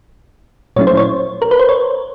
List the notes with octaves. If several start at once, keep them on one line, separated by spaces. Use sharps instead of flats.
A#2 F#3 A3 C#4 E4 C#5
C5
C#5
A#4
B4
C5
C#5